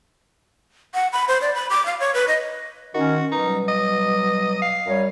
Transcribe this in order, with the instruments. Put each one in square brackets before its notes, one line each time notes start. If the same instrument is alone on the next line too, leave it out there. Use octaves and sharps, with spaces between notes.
[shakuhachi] F#5
B5
C5
D5
B5
D6
F5
C#5
B4
D#5
[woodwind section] D#3 C#4 [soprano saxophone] F#4
[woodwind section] B2 F#3 G3 [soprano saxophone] D#4
[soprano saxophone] D#5
F5
[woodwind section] F#2 G3 C#5